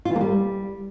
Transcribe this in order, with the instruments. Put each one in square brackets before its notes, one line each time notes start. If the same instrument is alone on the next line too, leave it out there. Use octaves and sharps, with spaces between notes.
[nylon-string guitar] F4
E3
A#3
G3